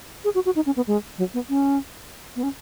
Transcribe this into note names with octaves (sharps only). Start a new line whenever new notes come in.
G#4
F#4
F#4
D#4
C#4
B3
G#3
F#3
B3
C#4
B3
C#4